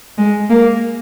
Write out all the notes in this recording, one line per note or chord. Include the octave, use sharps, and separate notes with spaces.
G#3
A#3